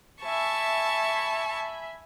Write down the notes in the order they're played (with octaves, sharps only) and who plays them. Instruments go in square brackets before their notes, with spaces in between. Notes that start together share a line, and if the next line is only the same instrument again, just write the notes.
[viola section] E5 G#5 B5 [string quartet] A5 C#6